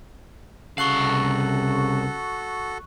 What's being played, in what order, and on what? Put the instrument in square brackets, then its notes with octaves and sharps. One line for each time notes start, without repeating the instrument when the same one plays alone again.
[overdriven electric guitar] C2 F5 [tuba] C#3 [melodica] F#4 A4 [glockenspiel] C#6 F#6 F#7